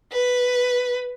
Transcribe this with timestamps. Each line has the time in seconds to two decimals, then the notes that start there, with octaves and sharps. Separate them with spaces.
0.13 B4